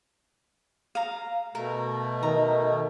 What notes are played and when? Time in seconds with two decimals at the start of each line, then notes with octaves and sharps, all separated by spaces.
0.95 F5 A#5
1.55 B2 A3 A#4
2.23 D#3 A#5